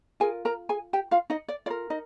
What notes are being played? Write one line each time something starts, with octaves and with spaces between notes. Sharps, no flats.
F4 G#4 A#4 G#5
A#4 A#5
G#4 G#5
G4 G5
F4 F5
D#4 D#5
D5
F4 A#4 D5
D#4 D#5